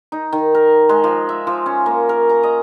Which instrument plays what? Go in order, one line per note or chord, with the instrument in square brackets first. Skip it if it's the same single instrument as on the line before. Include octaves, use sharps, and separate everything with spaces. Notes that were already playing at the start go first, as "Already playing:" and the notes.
[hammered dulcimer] D#4
D#3
A#4
G#3
F3
E5
F3
C#4
A#3
A#4
A#5
D#5